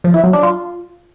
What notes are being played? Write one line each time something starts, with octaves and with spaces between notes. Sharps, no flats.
F3
E4
F#3
D4
F4